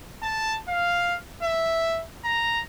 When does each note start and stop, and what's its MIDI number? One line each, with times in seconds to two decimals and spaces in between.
0.22 0.54 81
0.68 1.15 77
1.42 2.02 76
2.24 2.61 82